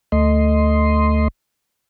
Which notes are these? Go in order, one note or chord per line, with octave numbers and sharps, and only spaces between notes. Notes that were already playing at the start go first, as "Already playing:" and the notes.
D2 A3 D#5 C6